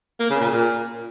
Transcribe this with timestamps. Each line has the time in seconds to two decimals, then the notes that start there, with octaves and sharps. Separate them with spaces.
0.19 A#3
0.30 C#3
0.40 A#2
0.51 A#2